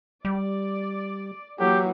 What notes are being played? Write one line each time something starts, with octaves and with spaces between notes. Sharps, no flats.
G3 D5
E3 F#3 A#3 F#4 G4